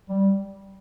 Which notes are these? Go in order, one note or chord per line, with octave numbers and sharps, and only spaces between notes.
G3